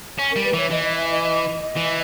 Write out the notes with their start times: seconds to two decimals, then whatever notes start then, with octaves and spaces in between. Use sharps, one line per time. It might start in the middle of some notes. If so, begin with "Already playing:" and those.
0.18 C#4 G#5
0.31 A#4
0.36 G3
0.44 B4
0.54 E3 C#5
0.71 E3 D#5
0.84 D#5
0.97 E5
1.11 D#5
1.23 D#5
1.76 E3